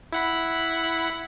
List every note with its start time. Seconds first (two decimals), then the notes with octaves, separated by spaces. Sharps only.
0.12 E4 F#5 B5